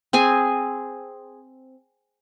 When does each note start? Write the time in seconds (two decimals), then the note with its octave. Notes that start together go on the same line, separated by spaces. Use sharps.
0.13 C4 G#4 G#5